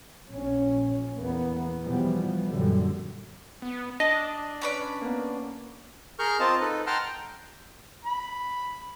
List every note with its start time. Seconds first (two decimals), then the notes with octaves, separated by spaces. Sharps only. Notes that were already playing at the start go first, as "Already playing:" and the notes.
0.30 A#1 C#4
1.16 E2 A#3 B3
1.84 B2 E3 F3 G3 B3
2.45 A#1 F#2 D3 G3
3.62 B3
4.00 D4 D#5 A5
4.62 C#4 B4 D5
5.01 A#3 B3
6.19 G#4 A#4 C#6 F6 G6
6.40 C4 F4 D#5 A5
6.60 D#4 A4 B4
6.87 F#5 G5 A5 A#5 C6 F6
7.05 G5
8.05 B5